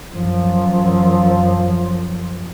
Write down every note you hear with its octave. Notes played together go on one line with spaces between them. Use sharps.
F#2 F3